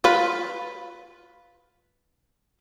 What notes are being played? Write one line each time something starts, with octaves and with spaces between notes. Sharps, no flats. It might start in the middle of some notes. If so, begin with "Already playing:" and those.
F4 B4